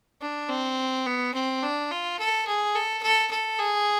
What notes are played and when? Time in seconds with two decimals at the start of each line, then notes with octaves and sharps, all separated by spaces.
0.22 D4
0.50 C4
1.06 B3
1.34 C4
1.63 D4
1.91 F4
2.19 A4
2.47 G#4
2.75 A4
3.03 A4
3.31 A4
3.59 G#4